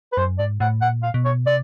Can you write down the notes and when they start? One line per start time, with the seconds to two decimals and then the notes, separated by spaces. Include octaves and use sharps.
0.12 B4
0.17 F#2 C5
0.39 G#2 D5
0.60 A2 F#5
0.81 A#2 F#5
1.03 F5
1.14 B2
1.25 C#5
1.46 C3 D5